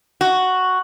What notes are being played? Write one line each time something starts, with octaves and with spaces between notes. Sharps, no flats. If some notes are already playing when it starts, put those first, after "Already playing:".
F#4